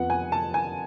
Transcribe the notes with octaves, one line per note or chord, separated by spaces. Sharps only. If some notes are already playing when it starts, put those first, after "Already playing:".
Already playing: F2 F3 B3 F#5
G#5
A5
G#5